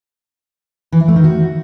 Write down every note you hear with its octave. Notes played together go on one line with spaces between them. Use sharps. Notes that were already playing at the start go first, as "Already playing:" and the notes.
E3
E4
A3
D#3
F#4